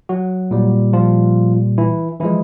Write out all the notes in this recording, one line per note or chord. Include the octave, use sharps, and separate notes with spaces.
F#3 F#4
A#2 G3
F3 F4
E3 E4
E3 F3 G#3 E4